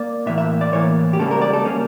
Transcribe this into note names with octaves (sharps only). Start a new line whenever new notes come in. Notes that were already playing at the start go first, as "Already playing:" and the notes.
Already playing: A#3 D5
A2 E3 A#3 E5
E5
D5
A2 E3 A#3 C#5
G4
C#2 C#3 G3 A#3 A4
A#4
D5
A4
C#3 G3 A#3 C#4